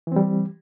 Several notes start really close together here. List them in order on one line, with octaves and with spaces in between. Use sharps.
E3 C4 G3